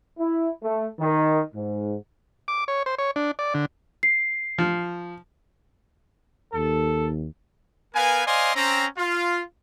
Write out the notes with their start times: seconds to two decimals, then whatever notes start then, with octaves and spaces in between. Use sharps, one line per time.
0.19 E4
0.62 A3
0.99 D#3
1.54 G#2
2.48 D6
2.68 C#5
2.86 C5
2.98 C#5
3.16 D4
3.39 D5
3.54 D3
4.03 C7
4.58 F3
6.53 D#2 A4
7.95 B3 A#4 B4 F5 G#5
8.26 C5 D5 D#5 F5 G#5 C6
8.55 C4 C#4 A#5
8.97 F4